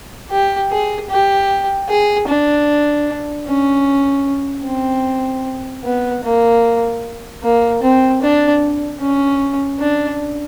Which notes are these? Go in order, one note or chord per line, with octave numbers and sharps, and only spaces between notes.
G4
G#4
G4
G#4
D4
C#4
C4
B3
A#3
A#3
C4
D4
C#4
D4